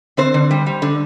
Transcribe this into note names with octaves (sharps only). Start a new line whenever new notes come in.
D3 C4 C5
D3
G3
G3
D3